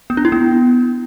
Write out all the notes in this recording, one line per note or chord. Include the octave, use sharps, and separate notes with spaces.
B3
D4
E4
B3